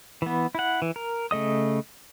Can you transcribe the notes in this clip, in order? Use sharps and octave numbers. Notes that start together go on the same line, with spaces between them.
E3 B3
E4 F#5
E3
A#4
C#3 A3 D#5 D#6